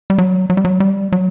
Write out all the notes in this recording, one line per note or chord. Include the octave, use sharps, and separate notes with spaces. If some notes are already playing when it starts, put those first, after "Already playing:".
G3
F#3
F#3
G3
F#3
G3
F#3